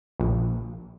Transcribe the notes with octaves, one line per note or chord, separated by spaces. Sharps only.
A#1